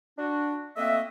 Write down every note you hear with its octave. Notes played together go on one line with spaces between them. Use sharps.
D4 F#4
A3 A#3 C4 F#4 D#5 E5